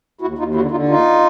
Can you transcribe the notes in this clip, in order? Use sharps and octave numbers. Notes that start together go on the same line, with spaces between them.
D#2 E4 F#4
D#2 D#4 F4
D3 E4 F#4
D3 D#4 F4
D#2 D#4 F4